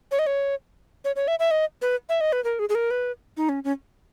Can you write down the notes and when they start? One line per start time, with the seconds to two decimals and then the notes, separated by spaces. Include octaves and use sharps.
0.11 C#5
0.19 D#5
0.27 C#5
1.05 C#5
1.16 C#5
1.28 E5
1.39 E5
1.51 D#5
1.82 B4
2.09 E5
2.21 D#5
2.32 B4
2.44 A#4
2.59 G#4
2.69 G#4
2.75 A#4
2.91 B4
3.37 D#4
3.49 C#4
3.64 C#4